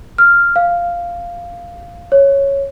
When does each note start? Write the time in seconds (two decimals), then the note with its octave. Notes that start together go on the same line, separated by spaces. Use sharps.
0.18 F6
0.56 F5
2.12 C#5